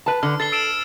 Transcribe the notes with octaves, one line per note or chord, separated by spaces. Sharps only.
B4 A5
D3 F6
A4 A6 C7 G7
E6 D7 E7